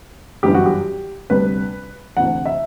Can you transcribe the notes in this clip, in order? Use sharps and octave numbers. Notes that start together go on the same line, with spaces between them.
G1 F#2 E3 G3 B3 G4
F#4
G4
D2 C3 G3 B3 B4
D2 C3 E3 F#5
E5